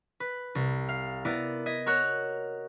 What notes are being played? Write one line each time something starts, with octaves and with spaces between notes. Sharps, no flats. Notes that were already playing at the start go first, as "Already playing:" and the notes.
B4
C2
F5
B3 E4 A#4 D5
D#5 G#6 B6
F#4 A#4 C#5 F#6